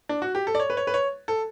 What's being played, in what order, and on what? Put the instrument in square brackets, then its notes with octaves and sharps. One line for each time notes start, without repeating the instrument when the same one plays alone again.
[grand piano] D4
F#4
G4
A4
D5
C#5
B4
C#5
B4
C#5
A4